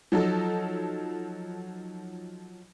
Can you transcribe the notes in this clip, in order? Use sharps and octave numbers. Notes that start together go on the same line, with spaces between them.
F3 F#3 D#4 A4